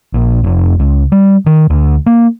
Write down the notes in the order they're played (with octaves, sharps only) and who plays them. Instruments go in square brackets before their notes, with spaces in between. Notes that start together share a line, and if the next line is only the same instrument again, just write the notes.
[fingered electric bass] A#1
F1
C#2
G3
D#3
D2
A#3